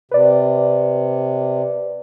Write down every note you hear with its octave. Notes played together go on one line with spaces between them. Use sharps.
C3 B4 D5